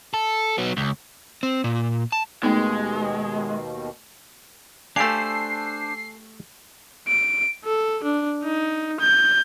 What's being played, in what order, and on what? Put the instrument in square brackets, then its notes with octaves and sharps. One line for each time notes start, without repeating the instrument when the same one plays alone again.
[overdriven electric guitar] A4
F#3 B3
C#2
[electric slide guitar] C4
A#2
A5
[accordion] D#2 B2 D#3 [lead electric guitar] G#3 [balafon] A3 D#4 [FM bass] B3
[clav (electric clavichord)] A3 G4 F5 [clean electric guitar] D4 C5 [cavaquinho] A4 G#5 [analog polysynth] C7
[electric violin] D7
A4
D4
D#4
G6